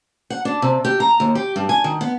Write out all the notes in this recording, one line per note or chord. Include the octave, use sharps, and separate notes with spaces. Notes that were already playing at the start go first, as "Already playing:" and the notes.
F#5
D4
C3
G4
A#5
D#2
G4
G2
G#5
D#3
B3